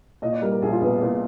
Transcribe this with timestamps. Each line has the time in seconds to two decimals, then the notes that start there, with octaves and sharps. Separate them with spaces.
0.22 A#2 D#5
0.33 D5
0.42 G3 A#4
0.52 A#4
0.62 A#1 G#4
0.72 F4
0.82 A#1 B3
1.02 A#2